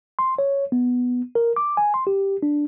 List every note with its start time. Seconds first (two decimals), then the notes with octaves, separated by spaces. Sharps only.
0.19 C6
0.39 C#5
0.72 B3
1.35 A#4
1.56 D6
1.77 G#5
1.94 C6
2.07 G4
2.43 D4